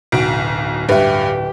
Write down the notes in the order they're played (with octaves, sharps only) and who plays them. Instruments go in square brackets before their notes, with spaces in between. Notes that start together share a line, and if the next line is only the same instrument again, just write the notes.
[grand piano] D1 F#4 D7 [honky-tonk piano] B1
[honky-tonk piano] G2 [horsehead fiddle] G4 [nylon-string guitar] B4 E5